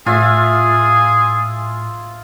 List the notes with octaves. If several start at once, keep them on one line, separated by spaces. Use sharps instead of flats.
A2 F4 G#4 E5